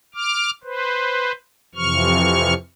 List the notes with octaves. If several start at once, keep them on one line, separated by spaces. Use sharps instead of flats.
D6 F6
B4 C5
F2 C3 E3 F3 C#6 F6